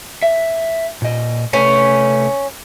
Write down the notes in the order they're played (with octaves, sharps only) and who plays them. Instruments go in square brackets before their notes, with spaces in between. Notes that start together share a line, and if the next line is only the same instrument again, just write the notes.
[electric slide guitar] E5
A#2 D#5
[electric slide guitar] C3 A3 B4 [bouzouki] C#4